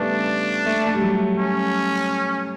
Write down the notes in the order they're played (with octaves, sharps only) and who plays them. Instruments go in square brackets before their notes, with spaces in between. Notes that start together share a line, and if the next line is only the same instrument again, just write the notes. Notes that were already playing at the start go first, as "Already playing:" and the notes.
Already playing: [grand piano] C#3 G3 A3 B3 [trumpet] D4
[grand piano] A3
A3
G3
F#3
[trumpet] C#4